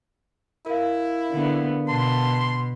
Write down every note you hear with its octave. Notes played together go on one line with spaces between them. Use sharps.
E4 A#4 F5
D3 B3
B2 A5 C6